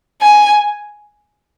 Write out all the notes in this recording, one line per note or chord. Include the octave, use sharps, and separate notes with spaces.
G#5